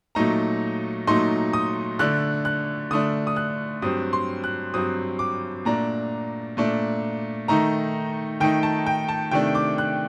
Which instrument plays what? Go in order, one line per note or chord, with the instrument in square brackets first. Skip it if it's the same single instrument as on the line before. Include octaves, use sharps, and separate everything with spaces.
[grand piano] A#2 F#3 A3 D#4 A#5
A#2 F#3 A3 D#4 C6
D#6
D3 A3 D4 F#6
F#6
D3 A3 D4 D#6
D#6
F#6
G2 F#3 C4 D#6
C6
F#6
G2 F#3 C4 D#6
D6
A#2 A3 D4 A#5
A#2 A3 D4
D#3 A3 D#4 A#5
D#3 A3 D#4 G5
A5
G5
A5
C3 D#3 A3 D4 G5
D6
F#6